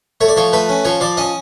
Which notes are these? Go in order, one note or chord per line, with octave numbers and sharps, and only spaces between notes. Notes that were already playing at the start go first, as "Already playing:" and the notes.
A3 C#5
D5
F3 C#5
A3 B4
C#4
F3 C#5
F3 D5
C#4 D#5